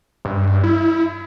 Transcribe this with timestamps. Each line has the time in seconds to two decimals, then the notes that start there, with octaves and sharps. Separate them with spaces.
0.25 G2
0.64 E4